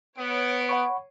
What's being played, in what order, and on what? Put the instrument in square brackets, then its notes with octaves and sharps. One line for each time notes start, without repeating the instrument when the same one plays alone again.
[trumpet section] B3 [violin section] C#5 D7
[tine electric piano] F#5 B5 C#6